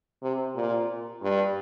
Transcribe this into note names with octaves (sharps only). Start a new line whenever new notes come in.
C3
A#2
G2